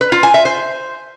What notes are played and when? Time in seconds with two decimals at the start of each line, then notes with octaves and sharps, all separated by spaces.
0.01 B4
0.12 F4
0.23 G#5
0.34 E5
0.45 C5